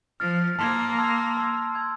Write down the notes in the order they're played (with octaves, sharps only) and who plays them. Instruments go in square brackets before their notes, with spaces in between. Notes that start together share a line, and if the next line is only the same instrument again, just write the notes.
[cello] F3 [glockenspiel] F6 A6 D7
[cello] A#3 [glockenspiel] A5 C6 E6 G#6
[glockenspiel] A5 C6 E6 G#6
A5 C6 E6 G#6
A5 C6 E6 G#6